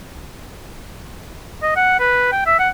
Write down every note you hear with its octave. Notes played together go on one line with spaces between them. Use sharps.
D#5
F#5
B4
G5
E5
F#5